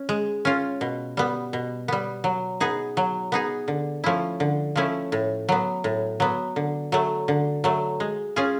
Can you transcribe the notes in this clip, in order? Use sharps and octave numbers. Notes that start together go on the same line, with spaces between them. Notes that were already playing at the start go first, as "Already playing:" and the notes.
Already playing: C#4
G#3
C#4 F4
B2
G3 B3
B2
G3 B3
F#3
B3 D#4 G#4
F#3
B3 D#4 G#4
D3
F3 A3 C#4 E4
D3
F3 A3 C#4 E4
A2
F#3 B3
A2
F#3 B3
D3
F#3 A3
D3
F#3 A3
G#3
C#4 F4 G#4